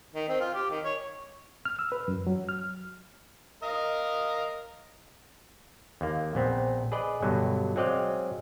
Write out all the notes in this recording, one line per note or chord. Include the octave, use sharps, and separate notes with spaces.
D#3
C4
F4
G4
D#3
C#5
F6
E6
B4
F#2
F#3
F6
A#4 D#5 F5
D#2 A#3
A#1 B3 C4
G#4 B4 D5 D#5
G2 B2 D3 F#3
F#3 G#3 C4 D5 D#5 F5